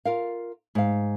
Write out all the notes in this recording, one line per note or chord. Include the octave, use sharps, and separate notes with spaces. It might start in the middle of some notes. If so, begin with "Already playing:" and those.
F4 A#4 F5
G#2 F5